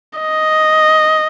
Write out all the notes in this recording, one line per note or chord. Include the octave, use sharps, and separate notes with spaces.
D#5